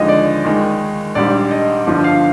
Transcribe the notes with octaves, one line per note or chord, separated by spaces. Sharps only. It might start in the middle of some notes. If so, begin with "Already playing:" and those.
Already playing: D#2 D3 F3 G#3 D#5
D5
D#2 D#3 G#3
A#1 G#2 G3 D5
D#5
G1 G2 F3
F5